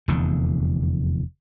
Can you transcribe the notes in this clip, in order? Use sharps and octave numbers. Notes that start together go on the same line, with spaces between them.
F1 E2 D3